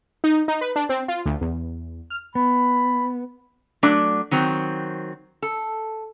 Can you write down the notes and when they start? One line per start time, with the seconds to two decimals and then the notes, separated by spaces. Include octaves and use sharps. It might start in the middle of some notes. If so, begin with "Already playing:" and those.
0.24 D#4
0.48 D#4
0.61 B4
0.76 D4
0.89 C4
1.08 F4
1.25 D2
1.41 E2
2.10 F6
2.35 B3 B5
3.83 F#3 A3 D4 D5
4.31 D#3 F#3 C4
5.42 A4